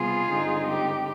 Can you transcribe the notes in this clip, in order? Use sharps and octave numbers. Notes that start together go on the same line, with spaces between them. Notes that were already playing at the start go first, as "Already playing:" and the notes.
Already playing: C3 G3 B3 F4 G#4
G2 D3 G#3 C4 D#4
G4